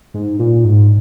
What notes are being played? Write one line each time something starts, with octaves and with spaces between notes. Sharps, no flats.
G#2
A#2
G#2